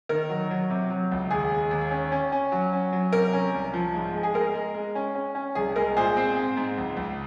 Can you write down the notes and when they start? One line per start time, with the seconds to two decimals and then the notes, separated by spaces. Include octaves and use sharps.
0.09 D#3 A#4
0.29 F#3
0.51 F#3
0.70 C3
0.90 F#3
1.12 C#2
1.31 D#2 G#4
1.51 G#3
1.71 D#2
1.91 C#4
2.12 C#4
2.32 C#4
2.52 F#3
2.73 C#4
2.92 F#3
3.13 C3 A#4
3.33 C#4
3.54 C2
3.73 F3
3.94 G#2
4.14 G#3
4.23 G#4
4.34 G#3 A#4
4.54 G#3
4.75 G#3
4.95 C#4
5.15 C#4
5.35 C#4
5.55 C2 G#4
5.76 G#3 A#4
5.96 A#2 G#4 C5
6.17 C4
6.36 G#2
6.57 G#2
6.78 C#2
6.97 C#2